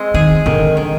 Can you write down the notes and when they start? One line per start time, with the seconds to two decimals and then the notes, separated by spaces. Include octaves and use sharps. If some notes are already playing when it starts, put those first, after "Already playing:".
Already playing: G#3 C4
0.14 D#3 G#4
0.46 D3 D#3
0.77 D#3